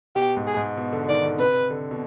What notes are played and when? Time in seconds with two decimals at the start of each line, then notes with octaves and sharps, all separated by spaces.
0.16 B2 G4
0.37 G#2
0.47 G#4
0.57 G#2
0.77 B2
0.93 D3
1.04 D3
1.09 D#3 D5
1.24 D3
1.38 C3 B4
1.70 D3
1.91 B2